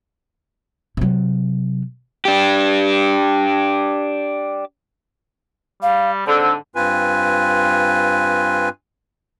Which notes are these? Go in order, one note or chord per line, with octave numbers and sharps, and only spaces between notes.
C3 F#3
D4 G4
G3 F5
G#2 D3 C4 E6
G2 C4 F4 B4 G#5